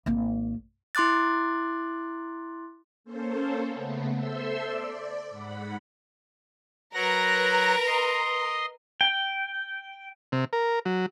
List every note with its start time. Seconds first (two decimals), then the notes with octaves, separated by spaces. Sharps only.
0.06 G#1 A#3
0.95 E4 C6 D6 F#6 A6
3.04 A#3 C#4 A4 C5
3.66 C#3 A3 B3
4.17 A4 C5 E5 C6 E6
4.62 D5
5.30 G#2 F#5 B5
6.94 F#3 A#4 B4 F#5 A#5 A#6
7.87 D#5 C6
9.01 G5
10.32 C3
10.53 A#4
10.85 F#3